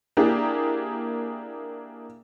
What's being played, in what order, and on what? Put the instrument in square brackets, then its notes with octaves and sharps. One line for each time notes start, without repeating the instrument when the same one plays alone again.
[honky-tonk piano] A#3 D4 E4 G4 G#4